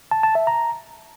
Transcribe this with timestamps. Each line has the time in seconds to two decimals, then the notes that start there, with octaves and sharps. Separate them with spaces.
0.11 A5
0.23 A5
0.35 E5
0.47 A#5